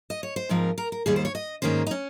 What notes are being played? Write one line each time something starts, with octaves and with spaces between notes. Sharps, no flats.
D#5
C#5
C5
G#2 F3 C4 A#4
A#4
A#4
D#2 D#3 G3 G#4
C5
C#5
D#5
G#2 D#3 A#3 C#4 C5
D#4
C#4